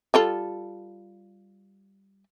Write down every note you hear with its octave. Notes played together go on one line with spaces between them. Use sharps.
G3 F4 A4